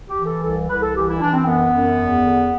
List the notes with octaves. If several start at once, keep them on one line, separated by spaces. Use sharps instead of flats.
G4
E3
A4
C2 A4
C2 B4
A4
E3 G4
E4
E3 D4
C4
F#2 B3
F#2
E2
D3